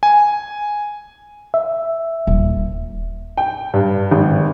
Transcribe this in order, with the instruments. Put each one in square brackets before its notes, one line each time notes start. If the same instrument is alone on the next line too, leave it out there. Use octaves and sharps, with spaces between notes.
[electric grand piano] G#5
[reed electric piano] E5
[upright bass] D#1
[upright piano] G5
G2
G#1